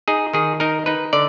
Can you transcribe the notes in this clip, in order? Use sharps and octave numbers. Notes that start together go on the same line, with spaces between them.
D#4 G#4
D#3 G#4
D#4 A#4
D#4 B4
D3 D5